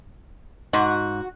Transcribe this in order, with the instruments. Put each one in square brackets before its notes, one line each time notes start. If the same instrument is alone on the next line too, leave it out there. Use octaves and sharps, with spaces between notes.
[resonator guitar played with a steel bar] G#2 [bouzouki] F#4